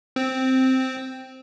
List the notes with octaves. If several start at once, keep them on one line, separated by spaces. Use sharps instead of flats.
C4